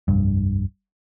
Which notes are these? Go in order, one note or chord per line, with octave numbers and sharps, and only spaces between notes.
F1 C2 G2